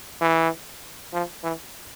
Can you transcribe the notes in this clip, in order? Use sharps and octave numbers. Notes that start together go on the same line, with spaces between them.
E3
F3
E3